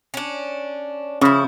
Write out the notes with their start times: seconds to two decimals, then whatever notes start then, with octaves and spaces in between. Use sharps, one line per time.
0.14 C#4 D4
1.21 C#3 F3 C#4 E4